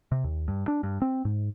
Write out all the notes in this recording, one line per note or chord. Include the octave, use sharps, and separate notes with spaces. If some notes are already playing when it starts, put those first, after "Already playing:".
C3
D#2
G2
D4
G2
C4
G#2